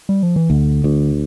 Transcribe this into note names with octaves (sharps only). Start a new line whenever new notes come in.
G3
F3
E3
D2 D3
D2